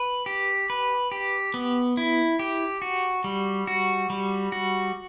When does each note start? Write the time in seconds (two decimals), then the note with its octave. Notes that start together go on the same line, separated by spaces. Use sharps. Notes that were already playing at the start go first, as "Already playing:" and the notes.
Already playing: B4
0.26 G4
0.70 B4
1.12 G4
1.54 B3
1.97 E4
2.39 G4
2.82 F#4
3.24 G3
3.67 F#4
4.10 G3
4.52 F#4